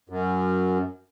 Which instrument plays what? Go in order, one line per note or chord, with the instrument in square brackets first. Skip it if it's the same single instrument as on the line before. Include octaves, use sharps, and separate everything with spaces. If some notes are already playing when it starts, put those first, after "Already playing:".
[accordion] F#2